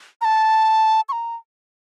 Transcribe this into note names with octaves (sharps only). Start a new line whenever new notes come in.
A#5
A5
C#6
A#5